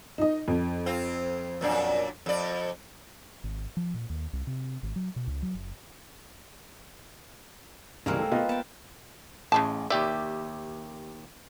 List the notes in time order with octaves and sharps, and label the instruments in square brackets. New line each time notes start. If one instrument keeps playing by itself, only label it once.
[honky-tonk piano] D#4 D#5
F2
[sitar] C4 F4
F#2 A#2 D4
F2 D5
[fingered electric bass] G#1
F3
A#2
D#2
C2
C3
G#1
F#3
B2
C#2
F#3
F#1
[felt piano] C2 G3 F6 [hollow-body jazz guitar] C#3 E3 [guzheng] G#3 A#3 C4
[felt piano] A3
[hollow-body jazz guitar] B2 A3 [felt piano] F4 B4 D#5
[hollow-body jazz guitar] B3 [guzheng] G5 A5
[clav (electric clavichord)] A1 [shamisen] C#3 G#3 A5
[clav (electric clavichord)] D#2 G4 E5 [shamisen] D5